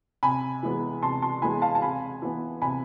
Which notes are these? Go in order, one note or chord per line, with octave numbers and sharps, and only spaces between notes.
C3 G#5 B5
E3 G#3 B3
C3 A5 C6
A5 C6
E3 G#3 B3 G#5 B5
F5 A5
A5
C3 G#5 B5
E3 B3
C3 G#5 B5